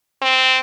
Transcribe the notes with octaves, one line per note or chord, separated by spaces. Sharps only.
C4